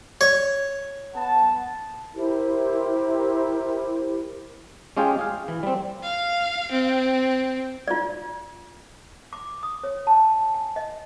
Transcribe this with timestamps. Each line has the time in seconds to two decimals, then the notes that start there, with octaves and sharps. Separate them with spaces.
0.21 C#5
1.14 B3 F#5 A5
2.15 E4 G4 A#4 C5
4.97 G#3 C#4 F4 G4 G#4 G5
5.19 G#4 F5
5.48 E3
5.63 G3 C4
6.03 F5
6.72 C4
7.88 F4 D5
9.33 D6
9.63 D#6
9.84 C#5
10.07 A5
10.54 G#5
10.76 D#5